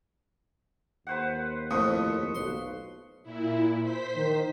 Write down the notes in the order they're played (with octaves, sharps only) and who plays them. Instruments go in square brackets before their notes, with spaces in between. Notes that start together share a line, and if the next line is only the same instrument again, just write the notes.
[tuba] D#2 [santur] B4 C5 F#5
[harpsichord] F2 A2 [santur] F3 B4 C#6 [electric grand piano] D#6
[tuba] B1 [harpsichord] C6
[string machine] A#2 E4
C5 B6
[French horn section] D#3